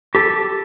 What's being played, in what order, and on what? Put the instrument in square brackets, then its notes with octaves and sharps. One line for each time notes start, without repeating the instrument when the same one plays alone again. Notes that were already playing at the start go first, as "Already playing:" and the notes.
[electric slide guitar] G4 A4